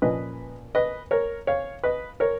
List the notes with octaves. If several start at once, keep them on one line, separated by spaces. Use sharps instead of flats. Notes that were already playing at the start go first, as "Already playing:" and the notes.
A#2 F3 A#3 C#4 B4 D#5
B4 D#5
A#4 C#5
C#5 F5
B4 D#5
A#4 C#5